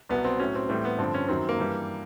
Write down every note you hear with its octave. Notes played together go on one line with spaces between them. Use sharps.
C2 B2 F#3 B3
C4
A2 F#3 C#4
C4
A2 E3 G3 C4
B3
G2 D3 F3 C4
C#4
F#2 D#3 F#3 C4
A#3
G2 E3 G3